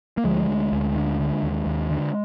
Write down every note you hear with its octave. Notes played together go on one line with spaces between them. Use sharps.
A#3
D2 F3 G#3
D2
D2
D3
D3
D#2
D#2
D3